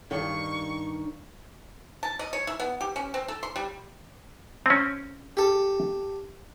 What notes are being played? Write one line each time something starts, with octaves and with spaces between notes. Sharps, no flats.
G2 D#3 C#6
A5
D#5
C#5
E4
B3
G4
C#4
C4
A4
C6
G3
C4 C#4
G4 A4